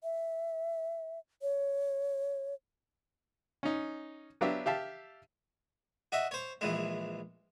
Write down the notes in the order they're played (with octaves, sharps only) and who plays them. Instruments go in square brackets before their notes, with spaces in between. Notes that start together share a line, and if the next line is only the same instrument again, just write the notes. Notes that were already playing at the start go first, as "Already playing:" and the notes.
[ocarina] E5
C#5
[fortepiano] C#4 D#4
F#3 B3 D4 G4 E5 F5
G4 E5 F5 A5
[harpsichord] F#4 D#5 E5
C5 C#5
A#1 E3 G#3